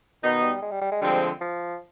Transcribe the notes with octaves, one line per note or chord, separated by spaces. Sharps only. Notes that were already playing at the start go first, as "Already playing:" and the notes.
B2 D#3 B3 D#4
G3
G#3
G3
G3
G#3
D3 F3 G3 G#3 C4
F3